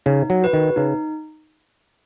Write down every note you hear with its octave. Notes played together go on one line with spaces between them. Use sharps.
C#3 D#4
F#3
F#4 B4
D#3
C#3 D#4